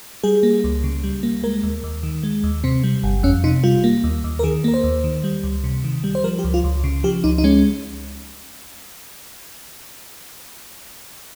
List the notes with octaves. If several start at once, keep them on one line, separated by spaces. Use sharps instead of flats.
G3 G#4
A#3
C#2
C#3
G3
A#3
G#3 A#4
D#2
D#2
D#3
G#3
D#2
C3 C4
G3
G1
F2 C#4
C3 D#4
G3 F4
A#3
D#2
D#2
A#4
D#3 G#4
A#3 A#4
C5
D#2
D#3
G3
C#2
C3
D#3
G3
C5
F3 A#4
G4
C#2
F4
C#2
C#3
F3 G4
C#2 D#4
D#4
G#3 C#4